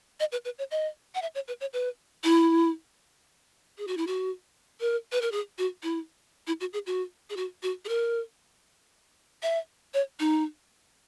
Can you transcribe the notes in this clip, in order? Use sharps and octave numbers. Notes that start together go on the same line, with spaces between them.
D#5
B4
B4
C#5
D#5
F#5
E5
C#5
B4
C#5
B4
E4
G#4
F#4
E4
F#4
A#4
B4
A#4
G#4
F#4
E4
E4
F#4
G#4
F#4
G#4
F#4
F#4
G#4
A#4
E5
C#5
D#4